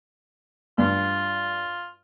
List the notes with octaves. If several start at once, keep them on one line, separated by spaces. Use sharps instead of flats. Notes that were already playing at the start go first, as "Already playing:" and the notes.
G2 F4